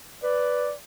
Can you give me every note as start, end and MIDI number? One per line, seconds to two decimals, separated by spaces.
0.23 0.69 71
0.23 0.75 74